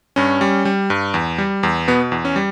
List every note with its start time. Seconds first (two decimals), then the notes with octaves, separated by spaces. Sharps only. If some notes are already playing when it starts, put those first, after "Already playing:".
0.16 G2 C#4
0.41 G3
0.65 G3
0.90 G2
1.14 E2
1.38 G3
1.63 E2
1.88 B2 B3
2.12 E2
2.25 C#4
2.36 G3